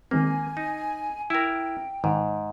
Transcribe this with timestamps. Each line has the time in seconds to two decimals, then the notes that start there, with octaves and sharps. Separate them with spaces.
0.11 D#3 G#3 A#3 C4 G#5
0.57 D#4
1.30 E4 A#4 G5
2.04 G#2 D#3 D#4